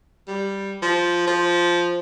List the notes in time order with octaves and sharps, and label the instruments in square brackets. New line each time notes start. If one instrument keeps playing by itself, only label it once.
[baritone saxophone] G3
F3
F3